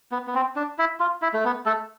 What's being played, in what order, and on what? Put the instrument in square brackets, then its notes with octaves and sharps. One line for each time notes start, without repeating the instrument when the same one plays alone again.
[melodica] B3
B3
C4
D4
E4
F4
E4
A3
B3
A3 A4